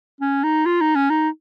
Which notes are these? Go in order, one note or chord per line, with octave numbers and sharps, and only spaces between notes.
C#4
D#4
F4
D#4
C#4
D#4